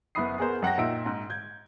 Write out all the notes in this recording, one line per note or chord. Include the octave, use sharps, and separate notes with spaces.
F#1 B3 E4 B5 D#6 C7
B3 G#4 A#4 C5
F#2 F#5 G5 A#6
A#2 D#4 E5 E6 D7
G#2
G6 G#6